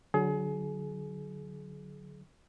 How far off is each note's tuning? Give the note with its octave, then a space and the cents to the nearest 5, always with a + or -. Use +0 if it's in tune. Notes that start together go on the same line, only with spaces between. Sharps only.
D3 +0 F#3 +0 G#4 +35